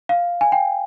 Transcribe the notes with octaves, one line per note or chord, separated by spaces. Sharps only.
F5
G#5
G5